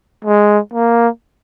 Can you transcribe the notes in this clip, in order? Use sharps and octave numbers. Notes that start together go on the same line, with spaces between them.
G#3
A#3